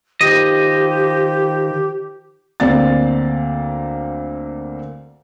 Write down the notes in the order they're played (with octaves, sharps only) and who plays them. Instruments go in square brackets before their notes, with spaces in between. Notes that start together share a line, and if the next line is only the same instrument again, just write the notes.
[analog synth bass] D#3 [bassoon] F3 [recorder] G4 [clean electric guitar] D#5
[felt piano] D2 A#3 C4 D5 F5 A6